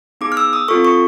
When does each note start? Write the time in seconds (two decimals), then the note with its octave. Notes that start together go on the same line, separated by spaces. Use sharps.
0.21 B3 D#4 G#4 D6
0.32 F6
0.37 E6
0.53 D#6
0.68 C4 F4 A4 C#6
0.85 C#6